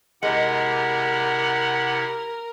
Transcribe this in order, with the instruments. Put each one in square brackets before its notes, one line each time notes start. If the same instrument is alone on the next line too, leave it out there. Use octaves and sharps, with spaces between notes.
[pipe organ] C3 E4 G4 [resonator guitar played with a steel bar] G#3 [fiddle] A#4 [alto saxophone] F#5